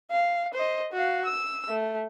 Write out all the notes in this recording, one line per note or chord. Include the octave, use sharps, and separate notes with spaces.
F5
C5 D#5
F#4 F5
E6
A3